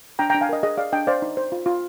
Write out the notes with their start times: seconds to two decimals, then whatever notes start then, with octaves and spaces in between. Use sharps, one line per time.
0.19 D4 G5 A#5
0.30 G5 A#5
0.34 D4
0.41 F5 G#5
0.49 A#4 D#5
0.63 G#4 D#5
0.77 G#4 D5 F5
0.92 D4 D#5 G5
1.07 C5 D5 F5
1.22 D#4
1.37 C5
1.52 F4
1.66 F4